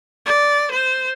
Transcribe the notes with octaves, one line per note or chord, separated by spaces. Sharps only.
D5
C5